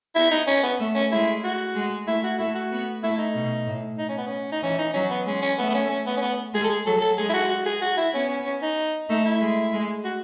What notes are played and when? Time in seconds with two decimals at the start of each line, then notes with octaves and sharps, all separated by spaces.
0.15 B3 E4
0.31 D#4
0.47 C#4
0.63 B3
0.80 A3
0.95 C#4
1.11 G#3 E4
1.44 F#4
1.75 G#3
2.07 A3 E4
2.23 F#4
2.39 A3 E4
2.55 F#4
2.72 B3
3.03 A3 E4
3.18 D#4
3.35 B2
3.67 A2
3.98 D#4
4.09 C#4
4.18 B3
4.27 C#4
4.52 D#4
4.62 E3 C#4
4.78 D#4
4.94 F#3 C#4
5.10 B3
5.26 G#3 C#4
5.42 C#4
5.58 A3 B3
5.70 B3
5.74 C#4
5.89 C#4
6.06 B3
6.17 C#4
6.22 B3
6.54 G#3 G#4
6.64 A4
6.69 G#4
6.86 F#3 A4
7.01 A4
7.17 G#3 G#4
7.30 E4
7.34 F#4
7.50 F#4
7.66 G#4
7.81 F#4
7.97 E4
8.13 B3 C#4
8.29 C#4
8.46 C#4
8.62 D#4
9.09 A3 D#4
9.25 E4
9.41 G#3
9.73 G#3
10.04 F#4